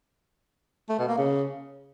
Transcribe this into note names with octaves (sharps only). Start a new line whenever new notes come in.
A3
B2
A#3
C#3